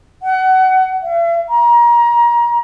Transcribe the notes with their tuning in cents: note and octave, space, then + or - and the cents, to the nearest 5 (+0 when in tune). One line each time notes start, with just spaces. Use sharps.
F#5 +25
E5 +45
A#5 +30